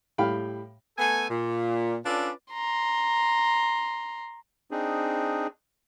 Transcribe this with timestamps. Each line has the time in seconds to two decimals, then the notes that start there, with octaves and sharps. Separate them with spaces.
0.18 A2 G3 F5 G5 B5
0.98 A3 B3 A4 G#5
1.30 A#2
2.05 C#4 D4 F4 A4 B4 D5
2.54 A#5 C6
4.71 C4 D4 D#4 G#4